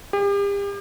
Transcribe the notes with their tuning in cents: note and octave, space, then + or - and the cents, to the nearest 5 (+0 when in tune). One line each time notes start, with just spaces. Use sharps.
G4 +40